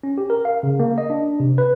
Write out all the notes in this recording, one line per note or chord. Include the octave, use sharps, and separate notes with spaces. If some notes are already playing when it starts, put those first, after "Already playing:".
C#4
G4
A#4
F5
C#3
A#3
D#5
D4
C3
B4